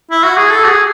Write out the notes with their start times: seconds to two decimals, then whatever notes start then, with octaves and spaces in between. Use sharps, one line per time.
0.11 E4
0.24 F#4
0.37 G#4
0.50 A4
0.64 F#4
0.68 G#4